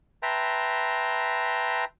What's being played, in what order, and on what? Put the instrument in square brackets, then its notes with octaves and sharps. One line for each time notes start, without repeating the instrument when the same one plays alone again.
[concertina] B4 E5 G5 A5 A#5 C6